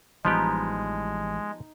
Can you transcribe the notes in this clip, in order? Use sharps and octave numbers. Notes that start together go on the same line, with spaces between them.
A1 E3 F3 G3 G#3 B3 D#4 G4